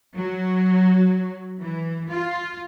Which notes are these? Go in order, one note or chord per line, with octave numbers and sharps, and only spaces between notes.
F#3
E3
F4